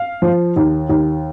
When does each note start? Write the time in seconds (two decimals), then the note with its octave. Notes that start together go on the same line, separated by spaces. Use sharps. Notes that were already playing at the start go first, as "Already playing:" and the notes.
Already playing: F5
0.22 F3
0.56 D#2
0.89 D#2